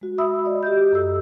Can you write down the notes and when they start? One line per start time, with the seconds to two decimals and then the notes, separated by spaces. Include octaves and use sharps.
0.01 G#3 F#4
0.18 E5 B5 D#6 E6
0.45 D5 D#5
0.63 G4 D#5 G6
0.92 F#2 A4 E6